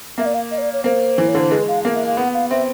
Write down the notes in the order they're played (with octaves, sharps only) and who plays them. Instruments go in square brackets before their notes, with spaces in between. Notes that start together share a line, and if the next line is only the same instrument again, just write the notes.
[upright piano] A#3 [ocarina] E5
[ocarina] D5
F5
D#5
C#5
D5
C#5
[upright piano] A#3 [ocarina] C5
[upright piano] E3
[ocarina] C#5
[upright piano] D3 [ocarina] C5
[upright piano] G#3 [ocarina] B4
[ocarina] F5
[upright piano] A#3 [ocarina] F5
[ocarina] E5
F5
[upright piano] B3 [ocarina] F#5
[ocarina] F5
[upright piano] C4 [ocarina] E5